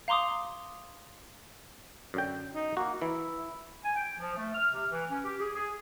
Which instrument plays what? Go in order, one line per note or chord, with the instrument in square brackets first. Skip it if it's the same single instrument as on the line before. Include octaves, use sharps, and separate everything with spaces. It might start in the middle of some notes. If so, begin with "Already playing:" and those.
[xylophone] F5 A#5 C6 D6 D#6
[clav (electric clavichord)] F#2 D3 G5
[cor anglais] D#4
[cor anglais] A#3 [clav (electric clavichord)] F#4
[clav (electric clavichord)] E3 [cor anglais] E4
[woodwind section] G#5
G5
F3
A3
F6
C3
E3
C#4
G4
G#4
G#4